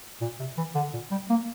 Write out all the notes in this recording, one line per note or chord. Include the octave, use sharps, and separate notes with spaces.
A#2
C3
E3
D3
A#2
G3
A#3